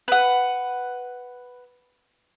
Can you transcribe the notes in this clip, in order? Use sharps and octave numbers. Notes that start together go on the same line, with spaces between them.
B4 F#5